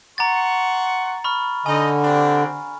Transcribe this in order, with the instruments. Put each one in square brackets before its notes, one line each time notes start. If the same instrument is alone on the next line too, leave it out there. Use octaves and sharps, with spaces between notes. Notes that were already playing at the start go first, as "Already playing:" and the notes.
[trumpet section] F#5 C6 C#6 [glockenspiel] A#5 A6
[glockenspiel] B5 C#6 F6
[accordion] D3 [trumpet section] D#4 D#5 [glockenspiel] G#5
[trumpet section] C4 D4 G4